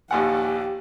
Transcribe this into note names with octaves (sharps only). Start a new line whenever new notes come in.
A#1 D#2 G4 F#5 G#5